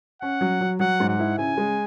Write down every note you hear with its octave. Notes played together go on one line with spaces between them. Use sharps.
C#4 F#5
F#3
F#3
F#3 F#5
G#2
F#5
E4
C#3 G#5
G#3